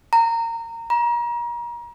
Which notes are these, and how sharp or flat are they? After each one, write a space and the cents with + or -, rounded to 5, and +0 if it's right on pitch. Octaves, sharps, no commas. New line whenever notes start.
A#5 -20
A#5 +35